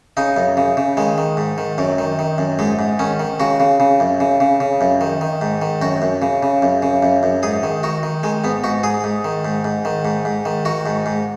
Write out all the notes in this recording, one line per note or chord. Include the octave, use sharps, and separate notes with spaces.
C#3 D#4
F#2
C#3
C#3
D#3 G#3
D#3
G#2
D#3
F#2 F#3
D#3
D#3
F#2
G#2 G#3
G#2
D#3 C#4
D#3
C#3 F#4
C#3
C#3
F#2
C#3
C#3
C#3
F#2
D#3
D#3
G#2
D#3
F#2 F#4
F#2
C#3
C#3
F#2
C#3
F#2
F#2
G#2 G#4
D#3
D#3 F#4
D#3
D#3 G#3
G#2 B3
G#2 F#4
G#2 G#4
G#2
D#3
G#2
G#2
D#3
G#2
G#2
D#3
D#3 F#4
G#2
G#2